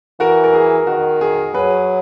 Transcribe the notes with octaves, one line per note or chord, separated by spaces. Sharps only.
E3 F#4 A#4
A#4
G#4
D#3 F#4
G#4
F#3 G#4 B4